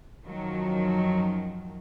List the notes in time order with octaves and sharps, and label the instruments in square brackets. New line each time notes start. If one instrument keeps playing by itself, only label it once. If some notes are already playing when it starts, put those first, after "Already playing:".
[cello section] F#2 D#3 F3 F#3